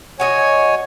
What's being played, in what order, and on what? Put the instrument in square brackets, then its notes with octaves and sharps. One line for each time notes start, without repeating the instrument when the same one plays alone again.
[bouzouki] F#4 G4 D#5 [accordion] C#5 G#5